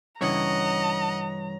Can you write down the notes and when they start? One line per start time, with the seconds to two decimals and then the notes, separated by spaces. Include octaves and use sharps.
0.21 G2 C#3 E3 C#5 D#5 F#5 A#5